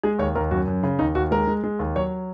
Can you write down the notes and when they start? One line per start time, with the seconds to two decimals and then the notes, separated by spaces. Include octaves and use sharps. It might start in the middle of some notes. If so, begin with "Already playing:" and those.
0.03 G#3 G#4
0.19 D#2 C#5
0.35 D#2 A#4
0.51 F#2 F#4
0.67 F#2
0.83 C#3
0.99 D#2 D#4
1.15 D#2 F#4
1.31 G#3 A#4
1.47 G#3
1.64 G#3
1.79 D#2
1.96 F#3 C#5